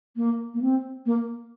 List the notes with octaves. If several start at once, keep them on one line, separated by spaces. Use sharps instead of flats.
A#3
A#3
C4
A#3